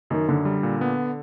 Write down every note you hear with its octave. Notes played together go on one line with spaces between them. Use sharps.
F#2 D#3
F#2 D3
G3
A#2
B3